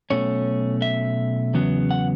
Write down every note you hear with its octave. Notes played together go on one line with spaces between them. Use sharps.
B1 B2 A3 C#4 C#5
E5
E2 C#3 F#3 B3
F#5